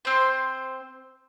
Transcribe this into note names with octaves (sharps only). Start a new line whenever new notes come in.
C4 C5